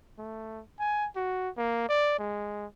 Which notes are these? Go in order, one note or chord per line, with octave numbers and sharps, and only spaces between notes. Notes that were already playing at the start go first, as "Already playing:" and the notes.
A3
G#5
F#4
A#3
D5
G#3